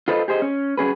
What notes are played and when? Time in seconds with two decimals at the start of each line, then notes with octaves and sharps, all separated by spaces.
0.08 F4 A4 B4 C5 D#5
0.28 G4 G#4 C5 D#5
0.42 C#4
0.78 F#3 C#4 G#4 B4